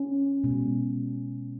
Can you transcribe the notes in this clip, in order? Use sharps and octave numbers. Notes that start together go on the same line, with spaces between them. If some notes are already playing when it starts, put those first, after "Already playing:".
Already playing: C#4
B2 G#3